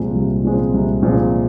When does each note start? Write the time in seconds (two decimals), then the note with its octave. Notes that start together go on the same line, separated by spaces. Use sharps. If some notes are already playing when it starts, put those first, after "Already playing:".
Already playing: C2 A#2 F3 G#3 C4
0.15 C2
0.45 A#2 F3 G#3 C4
0.74 C2
1.03 A#2 F3 G#3 C4